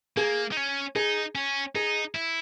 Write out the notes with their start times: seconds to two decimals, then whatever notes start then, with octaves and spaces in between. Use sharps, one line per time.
0.17 A#3 G#4
0.52 D#4
0.57 C#4
0.96 D#4 G#4
1.35 C#4
1.75 D#4 G#4
2.15 E4